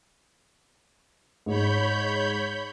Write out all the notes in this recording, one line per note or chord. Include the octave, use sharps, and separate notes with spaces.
G#2 C#5 B5 G6